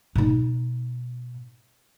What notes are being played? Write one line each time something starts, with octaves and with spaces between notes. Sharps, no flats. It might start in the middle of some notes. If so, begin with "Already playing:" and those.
B2 D#4